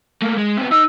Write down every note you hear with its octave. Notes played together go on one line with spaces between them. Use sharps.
A3 A#3
G#3
C3 B3
D#4 E6